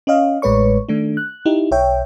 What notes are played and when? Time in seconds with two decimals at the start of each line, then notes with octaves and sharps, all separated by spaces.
0.07 C#4 C#5 D#5 F5
0.42 A1 A2 G#3 B4 C#5 C#6
0.89 D#3 A3 D4
1.17 F#6
1.46 D#4 E4 G4
1.71 B1 C#5 E5 G5